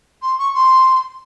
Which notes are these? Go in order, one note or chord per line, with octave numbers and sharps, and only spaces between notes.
C6
C#6
C6